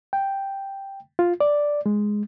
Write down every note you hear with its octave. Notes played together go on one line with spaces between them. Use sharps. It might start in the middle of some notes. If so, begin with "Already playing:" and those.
G5
F4
D5
G#3